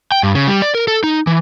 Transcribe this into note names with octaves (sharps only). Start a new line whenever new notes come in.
G5
G2
C#3
G3
D5
A#4
A4
D#4
E3